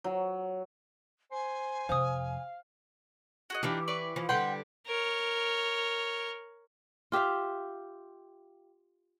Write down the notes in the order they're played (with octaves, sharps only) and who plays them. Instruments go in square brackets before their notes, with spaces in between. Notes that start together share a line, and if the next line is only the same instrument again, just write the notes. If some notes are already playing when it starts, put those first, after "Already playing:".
[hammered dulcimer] F#3
[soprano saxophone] C5 [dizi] G#5
[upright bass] F2 C3 [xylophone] C5 D#6 [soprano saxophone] F5
[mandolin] F#4 G#4 D#5
[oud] E3 G4 [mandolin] D4 D#4 F4
[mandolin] B4 D5 C#6
[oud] E3 F3
[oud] D3 G3 B4 [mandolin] F#5 G5 C6
[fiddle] A#4 C#5
[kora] F4 G4 E5 F5